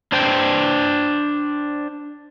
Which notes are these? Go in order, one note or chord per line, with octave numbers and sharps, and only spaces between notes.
D4 C5 G5